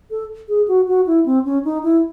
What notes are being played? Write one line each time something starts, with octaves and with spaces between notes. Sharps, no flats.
A4
G#4
F#4
F#4
E4
C4
C#4
D#4
E4